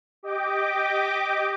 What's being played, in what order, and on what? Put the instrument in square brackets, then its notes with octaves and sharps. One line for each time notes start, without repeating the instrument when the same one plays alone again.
[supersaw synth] G4 D#5 G5 D6